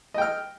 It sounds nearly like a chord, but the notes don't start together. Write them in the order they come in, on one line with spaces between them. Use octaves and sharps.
D#5 G5 F6